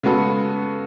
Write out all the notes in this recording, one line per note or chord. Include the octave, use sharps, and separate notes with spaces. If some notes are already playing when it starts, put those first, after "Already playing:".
C#3 G#3 B3 F#4 A4